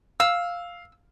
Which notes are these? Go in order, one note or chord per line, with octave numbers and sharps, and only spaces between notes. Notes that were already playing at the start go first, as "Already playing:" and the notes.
F5 E6